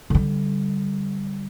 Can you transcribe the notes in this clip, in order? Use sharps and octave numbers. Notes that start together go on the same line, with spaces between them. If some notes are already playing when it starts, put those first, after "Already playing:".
D3 G3